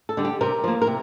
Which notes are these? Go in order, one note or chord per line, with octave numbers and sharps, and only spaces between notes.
A4
D3 G3
G4
C3 A#4
F3 A#3
A#4
C3